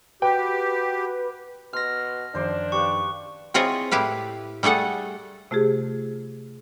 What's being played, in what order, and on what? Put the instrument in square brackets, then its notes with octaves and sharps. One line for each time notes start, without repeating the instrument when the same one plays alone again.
[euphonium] F#4 [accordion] G4 [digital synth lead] B4 [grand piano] G5
[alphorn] B2 [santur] C6 [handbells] F6 A#6
[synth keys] F#2 D#3 F3 [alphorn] D4 [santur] C5 D6
[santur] G4 B4 F5 [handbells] C#6
[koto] C4 E4 F4 G#4 C#5 D#5
A2 E4 G4 B4 F5
G3 A3 G#4 A4 F#5
[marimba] C3 A3 F4 G4 G#4